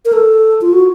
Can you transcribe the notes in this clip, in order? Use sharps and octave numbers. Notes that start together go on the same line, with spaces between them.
A#4
A4
F4
F#4